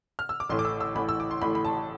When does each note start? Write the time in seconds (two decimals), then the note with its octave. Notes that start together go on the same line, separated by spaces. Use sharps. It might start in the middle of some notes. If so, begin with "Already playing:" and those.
0.19 F6
0.29 E6
0.40 D6
0.49 A1 A2 E3 C6
0.59 D6
0.65 E6
0.81 E6
0.95 A1 A2 E3 B5
1.09 E6
1.20 D6
1.31 C6
1.42 A1 A2 E3 B5
1.55 B5
1.65 A5